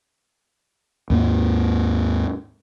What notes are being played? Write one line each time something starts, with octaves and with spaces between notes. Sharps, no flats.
D#2 G#2 A#3